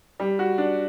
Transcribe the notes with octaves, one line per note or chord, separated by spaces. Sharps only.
G3
F#4
D4